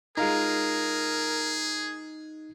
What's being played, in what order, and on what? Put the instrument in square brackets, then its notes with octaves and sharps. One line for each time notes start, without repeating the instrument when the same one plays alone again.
[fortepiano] G#3 F4 A#5 [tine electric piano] D#4 [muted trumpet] G#4 [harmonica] A#4